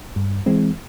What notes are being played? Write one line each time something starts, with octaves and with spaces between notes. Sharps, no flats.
G2
E3 G#3 C4